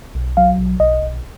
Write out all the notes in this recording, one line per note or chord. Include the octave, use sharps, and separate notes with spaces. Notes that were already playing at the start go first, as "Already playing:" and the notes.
B1
F#3 F5
B1
B1 D#5
B1